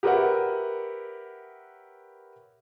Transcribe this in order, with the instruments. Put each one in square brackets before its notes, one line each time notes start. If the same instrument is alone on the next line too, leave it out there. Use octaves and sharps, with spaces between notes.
[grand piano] G4 A#4 B4 C#5 E5 F#5